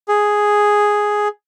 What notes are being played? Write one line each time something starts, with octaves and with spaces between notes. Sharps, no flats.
G#4